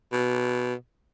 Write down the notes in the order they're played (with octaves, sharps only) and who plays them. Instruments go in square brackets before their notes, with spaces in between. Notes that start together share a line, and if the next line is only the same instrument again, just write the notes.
[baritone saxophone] B2